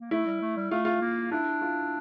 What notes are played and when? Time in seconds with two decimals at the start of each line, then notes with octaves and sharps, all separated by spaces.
0.01 A#3
0.11 A3 E4
0.26 G3
0.41 A3
0.57 G3
0.71 A3 F4
0.85 F4
1.01 A#3
1.32 D4 E4
1.61 F4